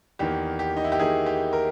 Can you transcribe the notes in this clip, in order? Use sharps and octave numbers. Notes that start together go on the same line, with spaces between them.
E2 D#3 A#3 G4
G4
D#4
E4
G4
E2 D#3 A#3 G#4
G4
A#4